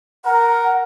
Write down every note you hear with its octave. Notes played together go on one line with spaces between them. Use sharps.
A#4 F#5